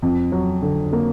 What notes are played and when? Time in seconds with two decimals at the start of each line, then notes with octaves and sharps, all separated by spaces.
0.02 F2
0.32 F#3
0.62 D3
0.93 A#3